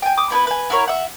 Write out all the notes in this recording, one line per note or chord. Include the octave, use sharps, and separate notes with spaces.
G5 G#5
D6 D#6
B3 E4 A#4 B4
B4 G#5
E4 F#4 A#4 C#5
E5 F#5